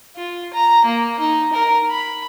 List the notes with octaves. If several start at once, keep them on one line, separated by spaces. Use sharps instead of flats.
F4
A#5
A#3
D#4
A#4
B5